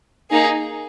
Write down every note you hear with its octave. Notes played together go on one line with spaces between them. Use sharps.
A#3 D#4 G#4